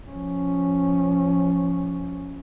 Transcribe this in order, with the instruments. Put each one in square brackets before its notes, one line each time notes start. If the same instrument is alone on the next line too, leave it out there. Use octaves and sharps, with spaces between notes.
[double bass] F3 C#4